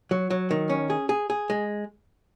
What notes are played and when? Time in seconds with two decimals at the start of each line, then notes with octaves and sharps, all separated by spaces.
0.11 F#3
0.30 F#3
0.51 D#3
0.70 C#4
0.90 G#4
1.09 G#4
1.30 G#4
1.50 G#3